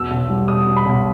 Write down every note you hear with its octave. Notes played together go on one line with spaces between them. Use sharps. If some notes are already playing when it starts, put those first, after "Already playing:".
Already playing: E1 B2 E6
B1
G3
B1 D#6
B2
B5
B1